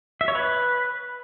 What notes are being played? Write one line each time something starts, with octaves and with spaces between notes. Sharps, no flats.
E5
C#5
B4